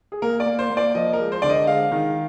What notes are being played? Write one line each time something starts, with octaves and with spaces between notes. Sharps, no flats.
G#4
A#3 A#4
D5
A#3
C5
A#3
D5
F3 D#5
A#4
G#3
C5
D3 D5
D#5
G#3 F5
D#3